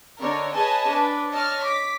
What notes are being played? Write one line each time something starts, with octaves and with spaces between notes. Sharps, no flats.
D3 D4 D#4 A#4 C#5
G#4 B4 C#5 D#5 G#5 A5
D4 B4
C#5 D#5 A5 F6
D6 B6